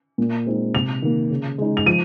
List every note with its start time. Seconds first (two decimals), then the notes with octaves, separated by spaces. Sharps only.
0.18 A#2
0.46 G#3 C4 D#4
0.74 C3 F7
1.02 D#3 A#3
1.30 C#3
1.58 G#3 D#4
1.77 F7
1.86 F3 D#7